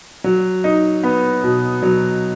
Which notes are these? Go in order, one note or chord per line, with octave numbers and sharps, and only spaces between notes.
F#3
D#4
B3
B2
F#3